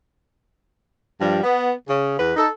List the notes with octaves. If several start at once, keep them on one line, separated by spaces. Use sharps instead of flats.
G2 F3 G3
B3
C#3
E2 B4
D#4 A4